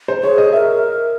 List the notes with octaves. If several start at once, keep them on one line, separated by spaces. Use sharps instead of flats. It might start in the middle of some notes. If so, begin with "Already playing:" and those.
C5
G#4 C#5
D#5
A#4 E5